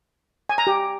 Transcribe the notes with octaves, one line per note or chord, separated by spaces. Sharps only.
G#5
A#5
G4